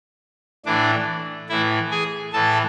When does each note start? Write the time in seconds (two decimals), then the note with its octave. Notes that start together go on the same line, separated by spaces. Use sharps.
0.66 A2 E3 D4 D5
1.49 A2 E3 E4 E5
1.91 G#4 G#5
2.33 A2 E3 A4 A5